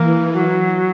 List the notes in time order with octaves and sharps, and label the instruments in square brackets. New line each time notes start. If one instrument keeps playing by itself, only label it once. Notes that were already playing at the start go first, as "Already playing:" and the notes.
Already playing: [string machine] E3 [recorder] A#3
[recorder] F#3